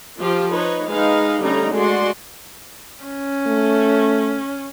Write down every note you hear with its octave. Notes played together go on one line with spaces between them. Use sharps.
F3 F4 G4 C5
D#4 B4 C#5
G#3 D#4 B4 F5
D3 G3 A3 C#4 D#4 A#5
G#3 F#4 D5 C6
C#4
A3